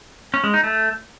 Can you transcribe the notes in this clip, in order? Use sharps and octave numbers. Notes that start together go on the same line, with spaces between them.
C#4
G#3
D#4
A3